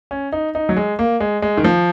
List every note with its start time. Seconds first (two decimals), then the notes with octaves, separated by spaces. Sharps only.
0.11 C#4
0.33 D#4
0.55 D#4
0.69 F#3
0.77 G#3
0.99 A#3
1.20 G#3
1.42 G#3
1.58 D#3
1.65 F3